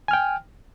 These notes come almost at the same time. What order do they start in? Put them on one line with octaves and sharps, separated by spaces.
G#5 F6 G5